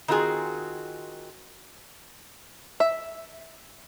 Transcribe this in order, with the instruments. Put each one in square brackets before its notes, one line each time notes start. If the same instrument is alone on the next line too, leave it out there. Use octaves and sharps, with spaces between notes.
[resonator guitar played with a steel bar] D#3 C4 F4 F#4 G#4
[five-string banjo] E5